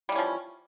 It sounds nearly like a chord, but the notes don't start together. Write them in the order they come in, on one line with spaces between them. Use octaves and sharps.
G3 E3 C#4 F3